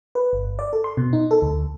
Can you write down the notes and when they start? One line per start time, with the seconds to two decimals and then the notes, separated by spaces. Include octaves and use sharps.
0.15 B4
0.33 G1
0.59 D5
0.73 A4
0.84 C6
0.97 B2
1.13 D#4
1.31 A4
1.42 D2